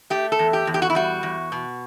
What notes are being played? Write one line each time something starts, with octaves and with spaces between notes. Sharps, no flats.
A3 G4
A4
E2
G4
E2
G4
F#4
E4
G3 F#4
E2
B2